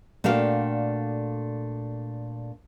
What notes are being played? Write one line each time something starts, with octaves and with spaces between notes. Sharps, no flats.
A#2 A3 D4 F#4 F5 G5